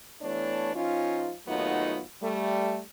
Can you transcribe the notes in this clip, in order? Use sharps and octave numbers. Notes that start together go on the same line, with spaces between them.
E3 A3 B3 D4 C#5
F3 C#4 D#4 F4
D#2 F#3 A3 B3 D#4 F4
G3 A3